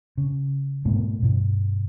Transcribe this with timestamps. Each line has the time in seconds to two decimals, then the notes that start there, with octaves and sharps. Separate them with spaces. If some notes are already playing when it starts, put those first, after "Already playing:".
0.18 C#3
0.85 G#2 B2 A3 B3
1.22 G2 B2